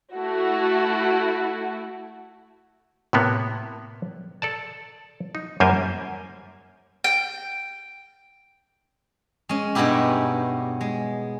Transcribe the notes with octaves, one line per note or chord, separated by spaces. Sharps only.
A3 E4 F#4
A2 C3 A#3 B3
A4 D5 A5
D#4
F#2 G3 A#3 G4 C5 G#5
G5
G#3 C#4
G2 B2 B3 D#4 E4 G4
G#3